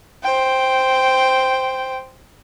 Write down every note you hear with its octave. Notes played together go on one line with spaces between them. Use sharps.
C5 G5